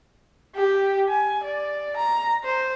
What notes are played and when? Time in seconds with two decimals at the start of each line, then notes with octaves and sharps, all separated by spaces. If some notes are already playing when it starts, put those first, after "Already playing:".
0.56 G4
1.09 G#5
1.44 D5
1.96 A#5
2.44 C5